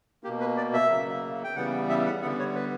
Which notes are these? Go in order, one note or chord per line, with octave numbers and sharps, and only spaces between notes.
B2 A#3 G4
B4
D5
E5
C#3 F#3 A#3
G5
C#3 E3 G3 B3 F#5
E5
F#5
D3 G3 B3 F#5
C#5
B4